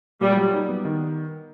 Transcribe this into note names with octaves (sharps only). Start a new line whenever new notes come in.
A#2 G3
F#3
D#4
B3
D#3